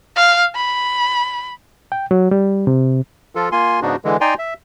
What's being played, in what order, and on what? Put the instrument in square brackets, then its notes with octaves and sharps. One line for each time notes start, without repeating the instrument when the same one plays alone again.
[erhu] F5
B5
[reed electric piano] G5
F#3
G3
C3
[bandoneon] F3 F4 A4
A#3 F4 G#5 C6
G#2 C#3 B3 D4 D#4 F#4
D3 E3 G#3
D#4 D5 G5 G#5 A#5 C6
E5